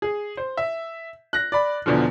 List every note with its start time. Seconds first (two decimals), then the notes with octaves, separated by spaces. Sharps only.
0.02 G#4
0.37 C5
0.57 E5
1.33 F#6 A#6
1.52 D5 B5
1.86 E2 B2 D3 F3